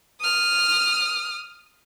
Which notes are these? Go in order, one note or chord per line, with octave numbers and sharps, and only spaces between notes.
D#6 F6